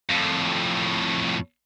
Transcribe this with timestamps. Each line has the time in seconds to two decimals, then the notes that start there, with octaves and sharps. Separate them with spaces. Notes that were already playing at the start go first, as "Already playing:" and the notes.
0.11 F2 A2